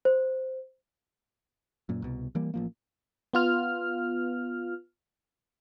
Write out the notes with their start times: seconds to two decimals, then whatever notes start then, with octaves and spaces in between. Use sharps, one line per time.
0.05 C5
1.89 F#2 A#2
2.02 C2 B2
2.35 E3 G3 A#3
2.54 A1 F3 A#3
3.33 B3 F4 F6